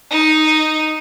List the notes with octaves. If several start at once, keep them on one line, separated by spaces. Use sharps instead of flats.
D#4